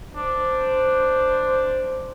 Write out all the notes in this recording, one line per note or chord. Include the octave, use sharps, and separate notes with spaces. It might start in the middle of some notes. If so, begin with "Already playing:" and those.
D4 C5